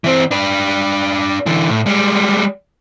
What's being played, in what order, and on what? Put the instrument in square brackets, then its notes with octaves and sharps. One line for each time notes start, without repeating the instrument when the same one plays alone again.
[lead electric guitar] E3 C4
D4 B4
D3 E3
A2
G3 G#3